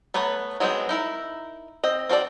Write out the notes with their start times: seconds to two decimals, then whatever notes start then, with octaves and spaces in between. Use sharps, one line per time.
0.14 A3 B3 B4 C#5 A#5
0.60 F#3 G#3 B3 C4 G5
0.89 D#4 E4 A#4
1.84 C4 D#5
2.09 C4 F#4 A4 D5